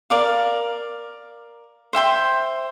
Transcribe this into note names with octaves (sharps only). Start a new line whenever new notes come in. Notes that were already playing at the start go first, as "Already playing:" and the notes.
A#4 D5 F5
C5 E5 G5 C6